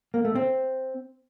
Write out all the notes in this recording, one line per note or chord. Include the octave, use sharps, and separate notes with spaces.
A#3
A3
C4